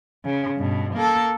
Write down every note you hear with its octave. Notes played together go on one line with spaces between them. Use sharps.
C#3
G2 B2
A#3 A4